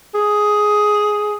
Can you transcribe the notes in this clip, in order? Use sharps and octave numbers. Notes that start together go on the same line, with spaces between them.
G#4